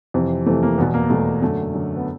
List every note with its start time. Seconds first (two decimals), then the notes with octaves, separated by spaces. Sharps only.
0.14 F2 C3 E3
0.46 F2 C3 E3 A3
0.63 A#3
0.78 E2 B2 B3
0.94 A#3
1.10 E2 B2 A3
1.42 F#2 D3 A3
1.74 F#2 D3
1.97 B3